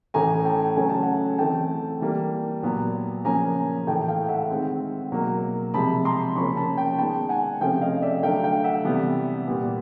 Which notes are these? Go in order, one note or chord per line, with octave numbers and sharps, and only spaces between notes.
A2 E3 A3 C#4 G#5 A#5
G5 A5
C#3 F#3 A3 C#4 G#5
A5
F#5 G#5
E3 A3 C4 G5 A5
E3 G3 A#3
A#2 F#3 B3
C#3 F3 A#3 C#4 G#5 A#5
A2 E3 A3 G5 A5
F5 G5
E5 F#5
D#3 G#3 C4
B2 F#3 A#3
C3 F3 G#3 A5 B5
A#5 C6
C#3 F3 A#3 C#4 B5 C#6
A5 B5
G5 A5
D#3 G#3 B3 G5 A5
F#5 G#5
C3 F3 A3 C#4 F5 G5
D#5 F5
D5 E5
D3 F#3 A3 F5 G5
F5 G5
E5 F#5
C3 E3 G3 B3
A#2 G3 B3